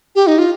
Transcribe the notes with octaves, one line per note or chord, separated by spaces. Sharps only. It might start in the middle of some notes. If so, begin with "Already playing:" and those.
G4
D#4
F4